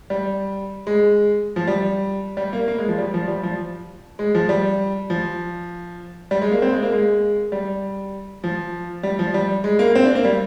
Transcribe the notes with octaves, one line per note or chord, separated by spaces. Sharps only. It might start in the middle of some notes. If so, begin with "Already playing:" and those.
G3
G#3
F3
G3
G3
A#3
A#3
G#3
F3
G3
F3
G3
F3
G#3
F3
G3
F3
G3
G#3
A#3
C4
G#3
A#3
G#3
G3
F3
G3
F3
G3
G#3
A#3
C4
D4
A#3
G3